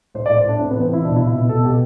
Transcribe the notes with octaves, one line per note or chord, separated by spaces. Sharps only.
A2 C5
A2 D5
C5
A2 D4
A2 C4
E3 B3
C4
E3 E4
B2 D4
E4
B2
E4
B2
B2 A4
B2 G4